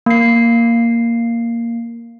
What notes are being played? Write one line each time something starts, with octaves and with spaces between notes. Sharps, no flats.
A#3 C7